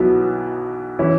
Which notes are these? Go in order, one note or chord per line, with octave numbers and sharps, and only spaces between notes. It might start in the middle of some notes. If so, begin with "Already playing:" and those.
Already playing: B1 B2 F#3 B3 E4
E3 C#4 E4